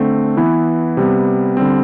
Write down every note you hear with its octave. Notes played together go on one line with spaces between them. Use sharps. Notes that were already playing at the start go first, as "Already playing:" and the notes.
Already playing: D3 A3 C4
E3 B3 E4
C3 G3 B3
D3 G3 C4